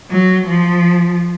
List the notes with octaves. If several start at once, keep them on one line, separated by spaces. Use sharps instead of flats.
F#3
F3